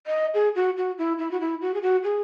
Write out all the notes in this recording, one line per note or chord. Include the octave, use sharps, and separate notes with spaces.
D#5
G#4
F#4
F#4
E4
E4
F#4
E4
F#4
G#4
F#4
G#4